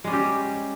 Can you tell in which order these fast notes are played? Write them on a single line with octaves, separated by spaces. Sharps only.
G#3 G3 C#4 G4